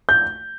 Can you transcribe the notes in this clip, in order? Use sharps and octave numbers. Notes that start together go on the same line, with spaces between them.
G6